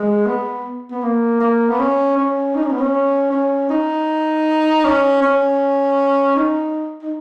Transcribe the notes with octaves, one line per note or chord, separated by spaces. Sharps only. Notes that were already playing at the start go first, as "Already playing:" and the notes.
Already playing: G#3
B3
B3
A#3
A#3
B3
C#4
C#4
D#4
C#4
B3
C#4
C#4
D#4
C#4
C#4
D#4
D#4